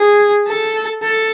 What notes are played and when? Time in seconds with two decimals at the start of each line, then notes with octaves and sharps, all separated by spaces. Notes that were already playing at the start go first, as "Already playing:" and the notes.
Already playing: G#4
0.47 A4
1.02 A4